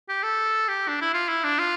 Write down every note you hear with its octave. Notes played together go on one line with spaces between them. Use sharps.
G4
A4
G4
D4
E4
F4
E4
D4
F4